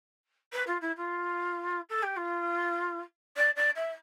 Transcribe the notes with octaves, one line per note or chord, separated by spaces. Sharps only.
B4
F4
E4
F4
A4
G4
F4
D5
D5
E5